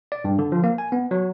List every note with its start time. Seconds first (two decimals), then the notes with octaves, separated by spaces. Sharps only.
0.12 D5
0.24 G2
0.39 D3
0.52 F3
0.64 A#3
0.78 G#5
0.92 B3
1.11 F#3